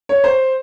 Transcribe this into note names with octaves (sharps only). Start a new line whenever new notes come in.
C#5
C5